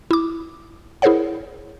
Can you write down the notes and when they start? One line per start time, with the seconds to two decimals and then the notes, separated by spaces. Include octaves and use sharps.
0.11 E4 D6
1.02 E4 G#4 A#4 C5 C#5 F#5